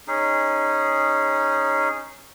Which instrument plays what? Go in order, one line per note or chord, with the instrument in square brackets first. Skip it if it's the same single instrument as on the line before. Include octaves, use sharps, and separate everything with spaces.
[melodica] C#4 D#4 G#4